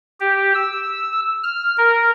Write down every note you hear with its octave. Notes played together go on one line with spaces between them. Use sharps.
G4
E6
F6
A#4